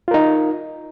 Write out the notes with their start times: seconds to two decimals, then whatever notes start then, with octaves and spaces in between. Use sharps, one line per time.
0.08 F4
0.11 A#4
0.14 D#4